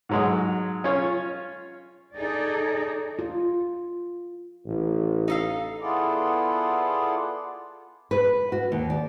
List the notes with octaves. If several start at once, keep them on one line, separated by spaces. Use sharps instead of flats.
G#2 F#3 G#3
C#4 F4 C#5
D#4 G#4 A4 D5 D#5
F4
A1
D#4 A4 F5
B3 E4 F4 G#4 A4 D5
B4
F#4
D#2
D5